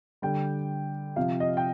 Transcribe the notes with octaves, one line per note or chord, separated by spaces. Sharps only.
D3 G3 G5
C3 F3 F5
D#5
G5